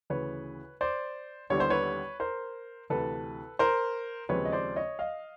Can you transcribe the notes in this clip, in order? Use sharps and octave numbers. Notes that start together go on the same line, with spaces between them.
D2 C#3 E3 B4 C#5
C5 D5
D#2 D3 G3 B3 E4 C#5
C5
B4 C#5
A#4 C5
D2 C3 E3 A4 B4
A#4 C5
D#2 C#3 F3 G#3 C4 B4 C#5
D#5
C5 D5
C#5 D#5
D#5 F5